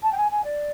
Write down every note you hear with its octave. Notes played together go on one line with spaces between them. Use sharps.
A5
G5
G#5
G#5
D5